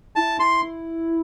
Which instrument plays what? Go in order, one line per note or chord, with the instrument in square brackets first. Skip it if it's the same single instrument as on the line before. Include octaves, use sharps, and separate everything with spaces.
[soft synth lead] E4 [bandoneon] A5
[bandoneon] C6